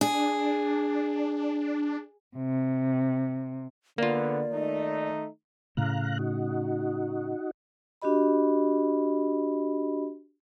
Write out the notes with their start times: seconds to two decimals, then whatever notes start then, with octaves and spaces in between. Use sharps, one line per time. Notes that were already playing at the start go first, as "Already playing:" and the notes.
0.01 D4 G#4
2.36 C3
3.98 D3 A#3 B3 F4 D5
4.51 D#3 A3 D#4
5.77 A2 C#3 A3 F5 A#5 F#6
6.19 D#4 F#4
8.02 D4 F#4 G4 D#5 B5